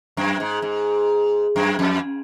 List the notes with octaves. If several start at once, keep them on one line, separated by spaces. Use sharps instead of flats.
F#2
G#2
G#2
F#2
F2